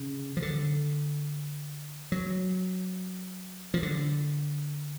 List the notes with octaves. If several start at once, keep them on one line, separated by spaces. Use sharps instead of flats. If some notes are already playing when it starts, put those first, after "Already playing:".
Already playing: C#3
F3
D3
F#3
F3
D3